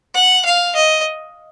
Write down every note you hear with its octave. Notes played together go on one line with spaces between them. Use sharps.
F#5
F5
D#5